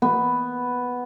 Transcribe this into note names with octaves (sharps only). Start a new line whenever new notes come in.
B3